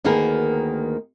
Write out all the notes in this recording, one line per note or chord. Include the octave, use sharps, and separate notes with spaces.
D2 D#3 A#3 B3 G#4 A#4